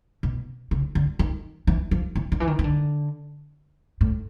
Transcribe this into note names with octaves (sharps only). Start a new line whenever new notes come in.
B2
C#3
D3
D#3
E3
F3
E3
D#3
E3
D#3
D#3
D3
A2